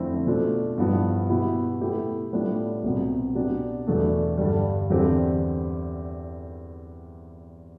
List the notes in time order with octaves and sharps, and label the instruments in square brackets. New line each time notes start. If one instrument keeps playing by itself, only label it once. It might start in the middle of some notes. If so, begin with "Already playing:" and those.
Already playing: [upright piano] F2 D3 A3 C4 E4
B2 A3 D4 F4
G2 F3 B3 E4 G4
B2 B3 E4 G4
B2 A3 E4 G4
A2 G3 B3 D4 F4
C2 B2 B3
B2 B3 D4 G4
E2 B2 A3 D4
G2 D3 G3
E2 D3 G3 C4 G4